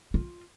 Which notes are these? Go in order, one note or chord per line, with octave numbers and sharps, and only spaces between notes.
F4